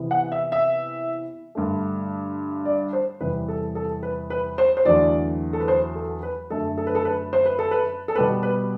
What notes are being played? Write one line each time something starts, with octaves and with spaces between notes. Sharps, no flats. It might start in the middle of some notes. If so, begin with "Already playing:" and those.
Already playing: C3 E3 B3
F#5
E5
E5
G2 D3 A3
D5
C5
E2 C3 G3 B4
A4
A4
B4
B4
C5
C5
E2 D3 F#3 A3 D5
A4
B4
C5
A4
B4
F#2 D3 A3 A4
A4
B4
A4
B4
C5
B4
A4
B4
A4
B2 G3 B3 B4
B4